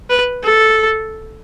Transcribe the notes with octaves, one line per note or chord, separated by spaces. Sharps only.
B4
A4